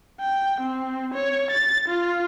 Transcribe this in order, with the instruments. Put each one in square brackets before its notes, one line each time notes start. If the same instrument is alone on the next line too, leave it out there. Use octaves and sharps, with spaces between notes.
[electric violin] G5
C4
C#5
A6
F4